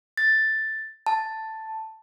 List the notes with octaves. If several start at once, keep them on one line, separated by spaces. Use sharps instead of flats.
A6
A5